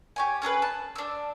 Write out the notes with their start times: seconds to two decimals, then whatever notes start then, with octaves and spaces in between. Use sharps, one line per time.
0.16 G4 C#5 G#5
0.42 C#4 G#4 A4 B4
0.62 A5
0.96 D4 E6